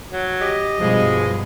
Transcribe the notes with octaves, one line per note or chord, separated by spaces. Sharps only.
F#3
G4 D#5
G2 B2 F3 G3 G#3